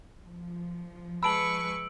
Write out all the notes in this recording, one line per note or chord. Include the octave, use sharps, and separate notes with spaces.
F3
G#3 B4 A5 B5 C#6 E6 D7 F#7